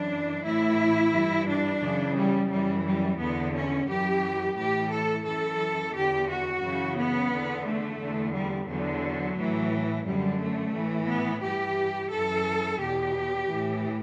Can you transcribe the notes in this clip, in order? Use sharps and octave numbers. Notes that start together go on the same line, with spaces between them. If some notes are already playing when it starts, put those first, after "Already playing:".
Already playing: F#2 E3 D4
A2 E3 E4
G2 E3
D4
F#2 C#3 E3
G3
F#2 E3 G3
G3
E2 D3 B3
C#4
F#2 E3 G4
A2 E3 G4
A4
F#2 E3 A4
E2 D3 G4
F#4
F#2 C#3 E3
B3
E2 D3
A3
E2 D3
G3
E2 D3 F#3
A2 E3
F#2 D3 G3
A3
A2 E3
B3
G2 E3 G4
F#2 E3 A4
E2 B2 G4
A2 E3